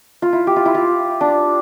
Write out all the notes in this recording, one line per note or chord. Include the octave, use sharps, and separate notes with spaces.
F4
E4
G4
F4
E4
F4
D4